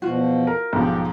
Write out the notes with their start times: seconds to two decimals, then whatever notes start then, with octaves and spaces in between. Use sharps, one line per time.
0.02 E2 B2 F3 F4 F#4
0.47 A#4
0.73 B1 G#2 F3 G4